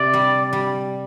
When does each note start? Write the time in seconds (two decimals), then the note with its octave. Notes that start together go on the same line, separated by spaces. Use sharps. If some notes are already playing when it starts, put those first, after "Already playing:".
Already playing: C3 D5
0.14 G3
0.53 G3